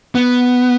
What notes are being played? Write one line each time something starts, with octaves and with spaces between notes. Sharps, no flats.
B3